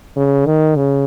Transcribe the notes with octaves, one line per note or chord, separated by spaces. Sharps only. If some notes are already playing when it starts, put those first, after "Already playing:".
C#3
D#3
C#3